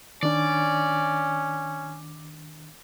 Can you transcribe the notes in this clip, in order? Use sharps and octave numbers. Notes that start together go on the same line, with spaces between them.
D#3 C#4 D4 D5